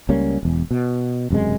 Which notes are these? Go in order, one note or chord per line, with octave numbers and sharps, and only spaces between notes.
C#2 G3 A#3 C#4
E1 E2
B2
E1 F#2 C3 G#3